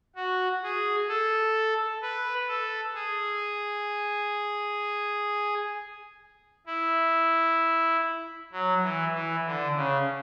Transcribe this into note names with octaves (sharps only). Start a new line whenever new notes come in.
F#4
G#4
A4
B4
A4
G#4
E4
F#3
E3
E3
D3
C#3